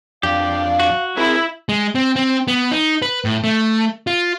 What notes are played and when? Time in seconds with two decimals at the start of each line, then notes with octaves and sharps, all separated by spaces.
0.23 F2 D4 G4 F5
0.80 F#4
1.17 C4 E4 G#4 A#4
1.69 G#3
1.95 C4
2.16 C4
2.48 B3
2.71 D#4
3.02 B4
3.25 A2
3.44 A3
4.07 F4